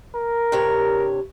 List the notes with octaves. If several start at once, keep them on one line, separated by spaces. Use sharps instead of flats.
A#4
G2 C3 C#5